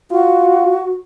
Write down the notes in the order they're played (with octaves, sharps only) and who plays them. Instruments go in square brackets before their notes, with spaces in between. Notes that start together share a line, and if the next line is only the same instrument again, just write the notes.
[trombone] F4 [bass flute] F#4